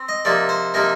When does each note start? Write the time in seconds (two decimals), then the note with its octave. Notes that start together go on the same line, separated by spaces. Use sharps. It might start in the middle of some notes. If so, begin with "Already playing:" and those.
Already playing: C4
0.09 D#5
0.25 C3 F3 A#3 D#4 D5
0.49 C5
0.74 C3 F3 A#3 D#4 A#4